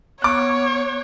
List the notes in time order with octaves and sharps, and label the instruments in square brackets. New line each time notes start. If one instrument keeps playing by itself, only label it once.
[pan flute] B3 [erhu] C#5 [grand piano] C#6 D6 F#6